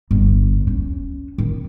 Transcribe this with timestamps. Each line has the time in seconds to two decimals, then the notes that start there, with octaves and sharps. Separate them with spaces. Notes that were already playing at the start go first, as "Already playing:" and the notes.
0.11 G1
0.67 C#4
1.38 D#3